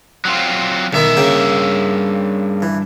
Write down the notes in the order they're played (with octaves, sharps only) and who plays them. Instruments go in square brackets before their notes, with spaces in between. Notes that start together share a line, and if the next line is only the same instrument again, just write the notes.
[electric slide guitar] F#3 C4 F4
[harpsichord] B1 D#3 D#4 [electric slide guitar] G2 E5
[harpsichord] C#3 A#3 G5
E3